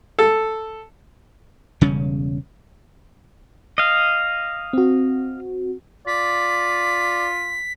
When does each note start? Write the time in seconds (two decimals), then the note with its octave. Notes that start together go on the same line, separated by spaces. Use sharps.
0.19 A4
1.81 E1 C#3 G3 C#4
3.78 D#5 F5
4.73 C4 F#4
6.07 F4 D5 B6